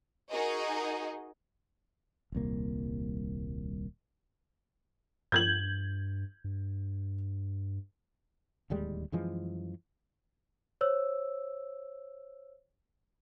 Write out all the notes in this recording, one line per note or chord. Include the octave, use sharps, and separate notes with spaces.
D#4 F#4 G#4 A#4 D#5
D#1 C2 A#3
G2 G6 G#6 F#7
G2
D1 D#2 G3 G#3
F#2 E3 F3 G#3
C5 C#5 E6